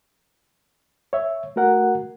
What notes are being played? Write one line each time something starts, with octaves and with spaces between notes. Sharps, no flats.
C#5 E5
A3 F#4 A#4 F#5